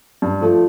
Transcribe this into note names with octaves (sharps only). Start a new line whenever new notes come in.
G2
F3 A3